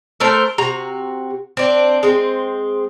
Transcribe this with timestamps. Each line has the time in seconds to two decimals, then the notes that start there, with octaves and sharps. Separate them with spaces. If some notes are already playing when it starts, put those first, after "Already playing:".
0.20 A3 A4 A#4 C5
0.58 C3 F#4 A#5
1.57 C4 D4
2.03 G#3 C4